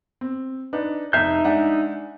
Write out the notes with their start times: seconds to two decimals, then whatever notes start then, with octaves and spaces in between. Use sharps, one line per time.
0.21 C4
0.73 D4 D#4 B4
1.13 F1 D#4 E5 G6 C7
1.44 G#3 D4 F#5